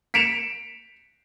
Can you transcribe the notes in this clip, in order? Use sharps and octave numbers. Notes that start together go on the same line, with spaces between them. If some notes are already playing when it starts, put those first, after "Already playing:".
B6 C#7 D7 E7 F7